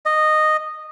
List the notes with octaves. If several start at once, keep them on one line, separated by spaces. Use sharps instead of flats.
D#5